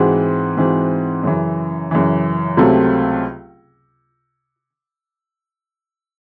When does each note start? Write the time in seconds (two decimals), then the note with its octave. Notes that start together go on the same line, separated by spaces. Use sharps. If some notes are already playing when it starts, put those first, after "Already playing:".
Already playing: G#2 E3 G#3 C4 F#4
0.57 G#2 E3 G#3 C4 F#4
1.23 F#2 C#3 E3
1.91 F#2 C#3 E3
2.57 C#2 C3 F#3 A3 C4